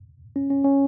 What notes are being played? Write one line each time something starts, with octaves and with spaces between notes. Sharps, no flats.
C#4
C#4
C#4